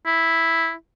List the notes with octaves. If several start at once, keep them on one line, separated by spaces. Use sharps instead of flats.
E4